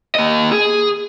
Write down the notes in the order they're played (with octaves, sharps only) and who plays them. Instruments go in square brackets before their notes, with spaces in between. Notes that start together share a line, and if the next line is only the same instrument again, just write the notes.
[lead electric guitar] A#3 D#5
G#4